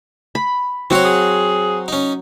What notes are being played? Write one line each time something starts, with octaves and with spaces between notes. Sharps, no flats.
B5
F#3 C4 F#4 C#5 F#5
G#4
C#4 D#4